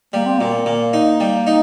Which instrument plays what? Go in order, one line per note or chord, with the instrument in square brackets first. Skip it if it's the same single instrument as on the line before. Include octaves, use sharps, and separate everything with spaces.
[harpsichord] G3 [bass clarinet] A#3
[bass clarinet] C4
[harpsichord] A#2 [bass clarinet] A#3
[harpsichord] A#2
D#4
G3
D#4